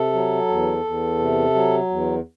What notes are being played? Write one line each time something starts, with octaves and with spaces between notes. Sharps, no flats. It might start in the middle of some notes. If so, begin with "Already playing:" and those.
Already playing: C3 A4
F#3
E2
E2
C3
F#3
E2